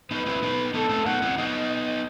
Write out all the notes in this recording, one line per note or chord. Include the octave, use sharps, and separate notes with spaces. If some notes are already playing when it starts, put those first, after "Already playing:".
B3 D#4 B4
C4 E4
B3 D#4
B3 D#4 A4
A3 C4
B3 D#4 F#5
C4 E4
B3 D#4 D#5
D#5